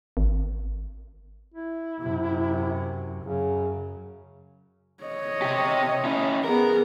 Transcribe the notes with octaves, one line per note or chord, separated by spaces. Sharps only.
G#1
E4
F#2 C3
F#2 C#3
C#5 D#5
C3 G4
C#4 E4
B3 G#4 A#4